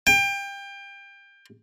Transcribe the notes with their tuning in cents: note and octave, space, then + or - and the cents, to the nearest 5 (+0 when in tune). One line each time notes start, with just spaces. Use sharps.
G5 +25